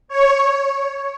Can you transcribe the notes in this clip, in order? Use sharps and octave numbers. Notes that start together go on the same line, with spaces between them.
C#5